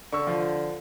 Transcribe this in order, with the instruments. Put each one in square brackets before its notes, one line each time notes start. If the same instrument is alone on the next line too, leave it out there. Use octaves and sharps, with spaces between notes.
[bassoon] D3 [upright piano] C#6 E6
[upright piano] F3